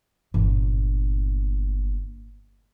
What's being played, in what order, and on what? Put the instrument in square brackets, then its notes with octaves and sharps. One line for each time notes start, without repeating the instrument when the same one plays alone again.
[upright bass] G1 A#2